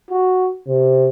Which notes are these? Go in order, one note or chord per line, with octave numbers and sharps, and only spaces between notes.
F#4
C3